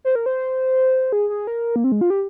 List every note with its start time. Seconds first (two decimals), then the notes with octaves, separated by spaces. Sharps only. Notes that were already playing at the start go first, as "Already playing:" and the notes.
0.05 C5
0.15 A#4
0.26 C5
1.12 G#4
1.30 G#4
1.47 A#4
1.76 A#3
1.84 C4
1.92 G#3
2.01 F4
2.10 G4